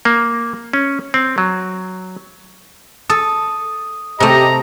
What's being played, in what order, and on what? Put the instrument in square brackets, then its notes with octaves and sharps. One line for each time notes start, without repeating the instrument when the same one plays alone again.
[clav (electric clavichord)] A#3
C#4
C4
F#3
[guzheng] A4 [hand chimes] D#6
[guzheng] C3 A3 [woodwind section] G4 D#5 [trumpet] A#5